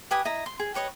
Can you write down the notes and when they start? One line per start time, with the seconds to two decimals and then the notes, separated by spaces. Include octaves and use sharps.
0.11 G4 B4 G#5 D#6
0.25 E4 D#5 A#5
0.46 C6
0.59 G#4
0.74 G4 B4 C#5 D#5